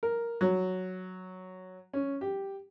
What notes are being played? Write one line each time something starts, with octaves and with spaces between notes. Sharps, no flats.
A#4
F#3
C#4
G4